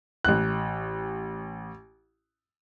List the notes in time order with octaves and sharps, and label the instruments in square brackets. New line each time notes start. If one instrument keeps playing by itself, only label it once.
[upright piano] A1 F#6